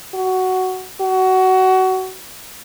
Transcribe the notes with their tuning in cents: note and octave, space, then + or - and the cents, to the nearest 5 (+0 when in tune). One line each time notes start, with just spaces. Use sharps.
F#4 +10
F#4 +20